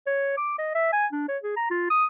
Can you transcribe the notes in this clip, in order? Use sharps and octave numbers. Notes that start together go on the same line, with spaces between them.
C#5
D6
D#5
E5
G#5
D4
C#5
G#4
A#5
F4
D#6